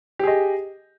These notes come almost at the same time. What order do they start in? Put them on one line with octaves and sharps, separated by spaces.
G4 G#4 D#5